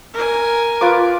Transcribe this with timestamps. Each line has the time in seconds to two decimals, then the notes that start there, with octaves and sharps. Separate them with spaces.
0.14 A#4 G#5
0.81 F4 B4 D6